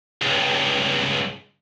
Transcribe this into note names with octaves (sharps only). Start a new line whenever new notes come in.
C#2 G2